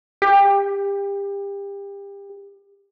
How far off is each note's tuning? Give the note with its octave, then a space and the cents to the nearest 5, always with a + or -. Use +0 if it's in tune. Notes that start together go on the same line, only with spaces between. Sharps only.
G4 +30